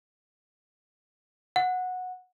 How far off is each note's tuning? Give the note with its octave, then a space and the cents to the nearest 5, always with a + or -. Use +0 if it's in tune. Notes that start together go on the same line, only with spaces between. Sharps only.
F#5 -10